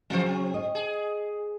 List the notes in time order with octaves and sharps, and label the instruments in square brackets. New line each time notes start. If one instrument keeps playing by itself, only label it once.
[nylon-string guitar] C#3 F#3 C#4 [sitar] E3 C5
[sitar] C4
[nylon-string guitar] D#5
[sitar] G#4